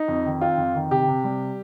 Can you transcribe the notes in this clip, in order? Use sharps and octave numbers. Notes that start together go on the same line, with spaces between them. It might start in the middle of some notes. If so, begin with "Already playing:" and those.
Already playing: D#4
F2
D#3
C4 F4
F2
D#3
C3 G4
C3
G3